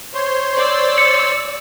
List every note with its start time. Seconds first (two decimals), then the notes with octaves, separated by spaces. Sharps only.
0.14 C5 C#5 C6
0.57 D5 E6
0.98 C#7